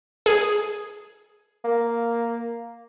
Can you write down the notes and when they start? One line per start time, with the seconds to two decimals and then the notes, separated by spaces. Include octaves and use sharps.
0.26 G#4
1.65 A#3